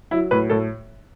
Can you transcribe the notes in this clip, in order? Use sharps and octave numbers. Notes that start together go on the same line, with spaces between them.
F#3 E4
A2 B4
A2 A4